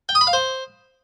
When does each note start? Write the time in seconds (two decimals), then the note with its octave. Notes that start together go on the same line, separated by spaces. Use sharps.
0.09 G5
0.15 D#6
0.21 B5
0.27 F5
0.33 C5